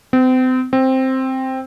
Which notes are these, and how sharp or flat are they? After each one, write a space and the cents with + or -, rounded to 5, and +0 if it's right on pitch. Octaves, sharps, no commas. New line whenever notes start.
C4 -35
C4 +5